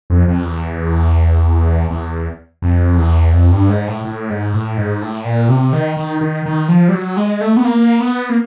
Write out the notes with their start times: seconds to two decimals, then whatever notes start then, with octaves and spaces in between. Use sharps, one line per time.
0.10 F2
0.28 F2
0.45 E2
1.90 E2
2.62 F2
2.97 E2
3.34 F2
3.51 G2
3.69 G#2
3.88 A2
4.05 A2
4.30 G#2
4.53 A2
4.77 G#2
5.02 A2
5.25 A#2
5.49 C3
5.73 D#3
5.97 D#3
6.21 D#3
6.46 D#3
6.68 F3
6.89 G3
6.93 F#3
7.17 G#3
7.41 A3
7.57 B3
7.64 A#3
8.00 B3
8.30 A#3